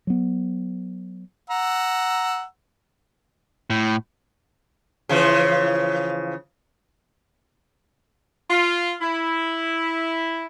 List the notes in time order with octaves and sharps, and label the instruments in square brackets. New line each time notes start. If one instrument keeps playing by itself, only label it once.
[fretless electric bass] F#3 B3
[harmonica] F#5 A#5 E6
[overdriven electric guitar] A2
[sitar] C#3 E3 F3
[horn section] F4
E4